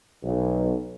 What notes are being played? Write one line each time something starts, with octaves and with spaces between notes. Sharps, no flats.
B1